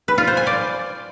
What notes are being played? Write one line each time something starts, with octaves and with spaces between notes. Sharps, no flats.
B4
F4
C5
G#5
D5